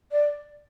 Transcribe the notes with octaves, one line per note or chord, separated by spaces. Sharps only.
D5